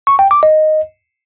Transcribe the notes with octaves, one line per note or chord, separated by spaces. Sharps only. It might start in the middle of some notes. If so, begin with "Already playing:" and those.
C#6
G5
D6
D#5